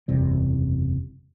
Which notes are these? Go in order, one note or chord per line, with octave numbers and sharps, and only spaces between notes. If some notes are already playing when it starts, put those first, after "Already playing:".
F#1 E2 C3 G3